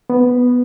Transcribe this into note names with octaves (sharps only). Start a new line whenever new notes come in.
B3